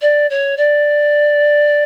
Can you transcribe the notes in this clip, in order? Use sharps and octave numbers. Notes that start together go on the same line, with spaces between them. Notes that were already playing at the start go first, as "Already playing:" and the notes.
D5
C#5
D5